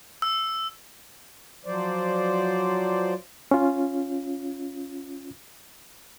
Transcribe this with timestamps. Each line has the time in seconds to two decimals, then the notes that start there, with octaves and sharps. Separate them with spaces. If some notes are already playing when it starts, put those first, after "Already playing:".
0.22 E6
1.65 F3 F#3 C5 D5
3.51 C#4 F4